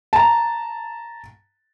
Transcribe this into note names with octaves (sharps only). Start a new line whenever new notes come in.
A5 A#5